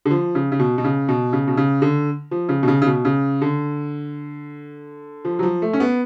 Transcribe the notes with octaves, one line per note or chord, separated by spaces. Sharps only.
D3
F3
C#3
C#3
B2
B2
C#3
B2
C#3
B2
C#3
D3
F3
C#3
B2
C#3
C#3
B2
C#3
D3
F3
F#3
F3
A3
C#4
B3